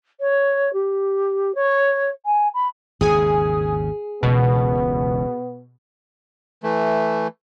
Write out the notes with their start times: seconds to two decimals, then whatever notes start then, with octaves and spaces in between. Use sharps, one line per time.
0.20 C#5
0.73 G4
1.55 C#5
2.26 G#5
2.54 B5
3.01 G#1 D#2 C#3 G#4 G#5 D#6
4.23 E1 C#2 B2 B3
6.63 E3 A3